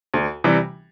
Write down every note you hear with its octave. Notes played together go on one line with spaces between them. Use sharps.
D2
C3 E3 G3